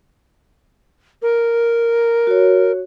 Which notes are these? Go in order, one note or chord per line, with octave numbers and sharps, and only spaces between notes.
A#4
F#4 C#5